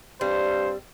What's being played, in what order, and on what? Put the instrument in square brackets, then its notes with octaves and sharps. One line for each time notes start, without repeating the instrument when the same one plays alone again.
[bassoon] G2 [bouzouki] G3 C4 [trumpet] C5